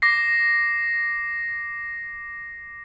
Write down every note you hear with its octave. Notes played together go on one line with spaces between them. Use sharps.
D6 A#6 C7